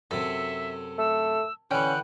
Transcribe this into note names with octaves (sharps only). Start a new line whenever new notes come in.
F#2 C3 A4 E5
A3 E6
D3 E3 C#4 F#5 G5 F#6